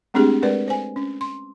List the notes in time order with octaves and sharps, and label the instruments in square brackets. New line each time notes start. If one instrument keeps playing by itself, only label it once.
[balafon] G#3 A3 C4 D4 G4 G#4
G#3 A#4 B4 D5
C5 G#5
C#4
C6